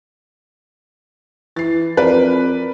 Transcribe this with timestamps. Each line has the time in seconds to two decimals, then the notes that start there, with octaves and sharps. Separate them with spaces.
1.56 E3 A6 C7
1.97 F2 A#4 B4 D5